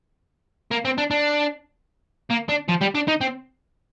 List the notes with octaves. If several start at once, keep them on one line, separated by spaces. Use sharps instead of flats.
A#3
C4
D4
D4
A#3
D4
F3
G3
D4
D#4
C4